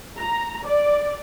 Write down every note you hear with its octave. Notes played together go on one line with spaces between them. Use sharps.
A#5
D5